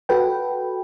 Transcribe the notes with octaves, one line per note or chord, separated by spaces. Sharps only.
F#4 A4 B4 G5